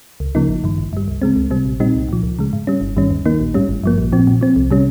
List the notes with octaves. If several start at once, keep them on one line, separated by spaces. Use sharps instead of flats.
C#2
C#3 F3 A#3 D#4
G#1
G2 D#3
G#1
G2 G3
C#2
C#3 G#3 C4
C#2
C3 G3 C4
A#1
A#2 G3 C4 D#4
C2
A#2 F3
C#2
C#3 G#3
G#2
G3 C#4
G1
G2 D#3 G3 C#4
D#2
D#3 A#3 D#4
A#1
G#2 G3 C#4
G#1
G2 F3 A#3
A#1
A#2 F3 C4
A#2
F3 C4
C2
C3 G3 C#4